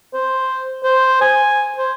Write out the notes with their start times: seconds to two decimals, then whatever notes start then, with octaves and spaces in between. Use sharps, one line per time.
0.13 C5
0.84 C5
1.21 G#5
1.77 C5